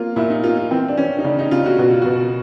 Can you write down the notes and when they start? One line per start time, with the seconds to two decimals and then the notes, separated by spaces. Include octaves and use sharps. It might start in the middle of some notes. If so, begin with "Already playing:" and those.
Already playing: A#3 F4
0.16 A#2 E4
0.30 D#4
0.43 A#3 F4
0.58 F4
0.71 E3 C4
0.88 D4
0.97 E3 C#4
1.18 D#4
1.24 C#3 D4
1.39 D#4
1.51 C#3 F4
1.66 F#4
1.79 B2 F#4
1.91 F4
2.02 B2 F#4